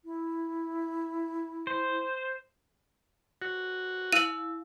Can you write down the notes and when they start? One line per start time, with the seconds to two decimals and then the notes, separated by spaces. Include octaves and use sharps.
0.05 E4
1.67 C5
3.42 F#4
4.13 E4 F5 E6 D#7 F#7